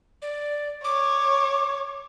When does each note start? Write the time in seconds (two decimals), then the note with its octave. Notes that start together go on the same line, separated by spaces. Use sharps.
0.22 D5
0.84 C#5 D6